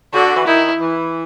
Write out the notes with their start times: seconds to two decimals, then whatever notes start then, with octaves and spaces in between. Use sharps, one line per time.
0.13 D3 F#4
0.35 E3
0.46 D#3 E4
0.80 E3